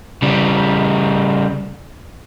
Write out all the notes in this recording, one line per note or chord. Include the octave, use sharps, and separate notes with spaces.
C#3 G3